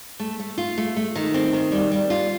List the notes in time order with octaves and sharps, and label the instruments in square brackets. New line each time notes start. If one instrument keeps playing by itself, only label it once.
[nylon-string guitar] A3
A3
F4
A3
A3
D#3
C4
D#3
G3
G3
F4